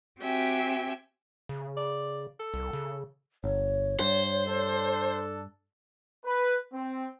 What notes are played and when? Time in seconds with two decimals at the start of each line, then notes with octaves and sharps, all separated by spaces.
0.20 C4 F#4 G4 E5 G5 G#5
1.49 C#3
1.77 D5
2.40 A4
2.54 C2
2.73 C#3
3.44 G1 C#5
4.00 G2 C5
4.47 D4 A4
6.25 B4
6.72 C4